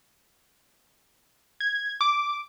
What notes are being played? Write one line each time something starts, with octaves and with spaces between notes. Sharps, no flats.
G#6
D6